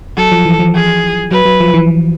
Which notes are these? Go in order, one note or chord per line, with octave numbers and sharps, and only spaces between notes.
F#3 A4
F3
E3
F3
G#4
F#3 B4
F#3
F3
E3